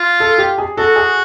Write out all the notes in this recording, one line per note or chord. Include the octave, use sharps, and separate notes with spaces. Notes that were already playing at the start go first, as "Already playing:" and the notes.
Already playing: F4
A4
G4
G#4
F#4 A4
G#4